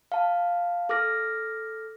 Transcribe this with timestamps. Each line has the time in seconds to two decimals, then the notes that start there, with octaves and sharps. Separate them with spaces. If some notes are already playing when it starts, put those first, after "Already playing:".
0.12 F5 A5
0.89 A4 D6 F6 A#6